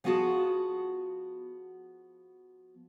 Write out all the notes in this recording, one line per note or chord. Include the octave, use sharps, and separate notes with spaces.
F3 B3 F4 F#4 G#4 A5